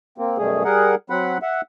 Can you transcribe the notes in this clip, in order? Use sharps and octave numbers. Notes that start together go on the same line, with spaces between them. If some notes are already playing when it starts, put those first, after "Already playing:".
A#3 C4
F#2 B2 G3 A3 G#4
G3 G#4 A#4 F#5
F#3 C4 F#5 B5
E5 F#5